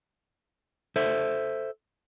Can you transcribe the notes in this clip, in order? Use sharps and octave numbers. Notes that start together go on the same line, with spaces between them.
A4 C5 E5